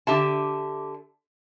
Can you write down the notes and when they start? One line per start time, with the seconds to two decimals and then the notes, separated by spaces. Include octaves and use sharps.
0.07 D3 G4 E5 A5